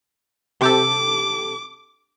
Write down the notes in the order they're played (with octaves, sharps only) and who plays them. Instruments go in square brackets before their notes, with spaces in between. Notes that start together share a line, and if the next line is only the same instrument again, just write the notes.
[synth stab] C3 G4 A4 [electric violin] D6